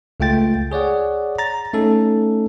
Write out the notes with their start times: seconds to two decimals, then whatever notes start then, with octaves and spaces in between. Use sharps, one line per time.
0.20 C#2 A3 F4 G5 A6
0.71 G#4 C#5 D5 F#5
1.39 A#5 A6
1.73 A3 C#4 D#4 A4